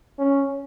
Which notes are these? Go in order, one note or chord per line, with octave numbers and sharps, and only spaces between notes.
C#4